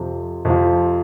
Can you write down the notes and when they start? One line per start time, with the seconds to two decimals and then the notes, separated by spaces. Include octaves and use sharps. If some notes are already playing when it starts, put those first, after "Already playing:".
Already playing: F2 C3 F3
0.45 F2 C3 F3